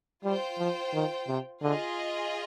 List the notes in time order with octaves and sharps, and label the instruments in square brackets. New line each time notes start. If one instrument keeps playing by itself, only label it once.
[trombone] G3 [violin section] F4 C5 G5
[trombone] F3
D#3
C3
[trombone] D3 [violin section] F4 G#4 D#5